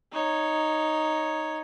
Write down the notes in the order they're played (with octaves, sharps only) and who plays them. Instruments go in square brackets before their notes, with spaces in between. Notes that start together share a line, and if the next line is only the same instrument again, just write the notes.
[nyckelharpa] D#4 C#5